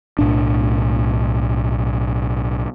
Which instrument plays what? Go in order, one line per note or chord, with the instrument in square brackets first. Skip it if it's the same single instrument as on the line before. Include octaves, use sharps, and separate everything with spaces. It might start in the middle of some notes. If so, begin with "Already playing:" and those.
[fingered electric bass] B1 A2 D4